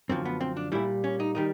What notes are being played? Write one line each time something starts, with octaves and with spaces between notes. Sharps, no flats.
F#2 D3 F3 C4
B3
C4
D4
A#2 G3 E4
C#4
D#4
D#3 G3 D#4